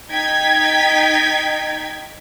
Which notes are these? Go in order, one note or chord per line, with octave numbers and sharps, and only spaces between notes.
D#4 G5 G#6 B6